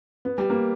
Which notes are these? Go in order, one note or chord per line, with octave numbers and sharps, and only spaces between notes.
B3
G3
A#3